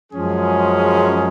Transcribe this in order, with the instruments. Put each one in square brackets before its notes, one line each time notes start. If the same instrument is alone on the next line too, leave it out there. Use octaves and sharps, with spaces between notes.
[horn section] F#2 F3 G#3 C#4 G#4